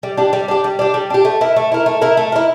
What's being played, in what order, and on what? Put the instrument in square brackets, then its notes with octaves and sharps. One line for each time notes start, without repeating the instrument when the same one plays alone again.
[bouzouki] G3
D4 G4
G3
D4 G4
G3
D4 G4
G3
D4 G4
A3
E4 A#4
A3
E4 A#4
A3
E4 A#4
A3
E4 A#4